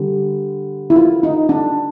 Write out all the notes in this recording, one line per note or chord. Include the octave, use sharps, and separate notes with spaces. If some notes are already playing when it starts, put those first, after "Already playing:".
Already playing: D3 G3
E4
F4
D#4
D4